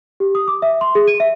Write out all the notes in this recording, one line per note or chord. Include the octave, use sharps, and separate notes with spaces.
G4
D#6
D6
E5
C6
G#4
D#7
E5